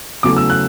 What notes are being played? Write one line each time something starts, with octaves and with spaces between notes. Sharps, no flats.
E2 C#3 F#3 A3 D6
E6
F#6